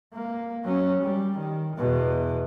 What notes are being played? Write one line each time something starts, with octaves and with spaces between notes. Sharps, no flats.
A#3
F#3 C#4
G3
D#3
E2 B2